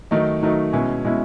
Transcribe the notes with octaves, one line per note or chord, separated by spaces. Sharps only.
D#3 F#3 A3 D#4
D#3 F#3 A3 D#4
B2 G#3 C#4 E4
B2 G#3 C#4 E4